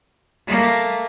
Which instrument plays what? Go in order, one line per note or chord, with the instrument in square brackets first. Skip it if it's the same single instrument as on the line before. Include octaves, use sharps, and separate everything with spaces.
[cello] A3 A#3